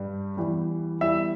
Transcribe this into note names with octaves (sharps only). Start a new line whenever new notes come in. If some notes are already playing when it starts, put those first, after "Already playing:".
Already playing: G2 G3
E2 E3 G3
E2 E3 G3 E5